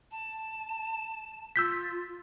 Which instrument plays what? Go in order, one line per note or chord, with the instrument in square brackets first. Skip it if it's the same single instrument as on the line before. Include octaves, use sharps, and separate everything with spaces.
[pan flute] A5
[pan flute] F4 [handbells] E6 G6 B6